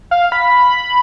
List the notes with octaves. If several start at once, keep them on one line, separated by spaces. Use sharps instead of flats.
F5
B5